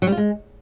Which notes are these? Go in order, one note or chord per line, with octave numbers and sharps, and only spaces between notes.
F#3
G3
F4
G#3